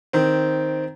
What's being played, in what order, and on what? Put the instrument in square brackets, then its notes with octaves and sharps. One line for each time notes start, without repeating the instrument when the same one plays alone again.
[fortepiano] D#3 C4